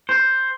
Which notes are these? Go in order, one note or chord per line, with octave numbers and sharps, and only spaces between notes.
C5